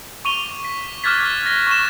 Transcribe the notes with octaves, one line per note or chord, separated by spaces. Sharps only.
C#6 D6 D#7 F7 G7
B6
D6 F6 F#6 G#6 A6 B6
A#6
C#6 E7